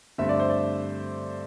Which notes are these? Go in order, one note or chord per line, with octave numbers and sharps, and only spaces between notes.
G2 D3 A3 C4 E5
D5
C5
D5